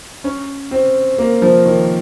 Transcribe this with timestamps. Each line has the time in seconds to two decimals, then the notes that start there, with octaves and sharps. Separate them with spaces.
0.24 C#4
0.71 C4
1.18 A#3
1.42 F3
1.65 D#3